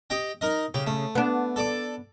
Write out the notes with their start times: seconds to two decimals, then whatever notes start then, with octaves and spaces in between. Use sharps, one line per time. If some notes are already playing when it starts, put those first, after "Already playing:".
0.10 G4 D#5 G5
0.41 D#4 A#4 D#5
0.74 C#3 G4
0.87 A3
1.15 B3 D4
1.56 A4 D5 D6